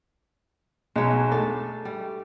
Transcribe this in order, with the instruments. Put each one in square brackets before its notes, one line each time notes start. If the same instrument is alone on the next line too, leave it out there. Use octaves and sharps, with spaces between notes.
[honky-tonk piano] B1 [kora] G#3 C#5
[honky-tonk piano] A3 [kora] D4
[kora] G3